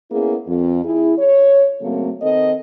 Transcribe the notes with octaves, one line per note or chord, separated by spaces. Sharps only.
A#3 B3 C#4 E4 G#4
F2
E4 G#4
C#5
C#3 F#3 A3 A#3 C4 A4
D#3 C4 A4 A#4 D#5